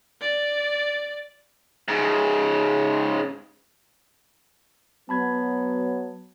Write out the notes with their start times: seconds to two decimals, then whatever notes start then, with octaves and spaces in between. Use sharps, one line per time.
0.21 D5
1.88 G#2 C#3
5.09 F#3 B3 A5 B5 G#6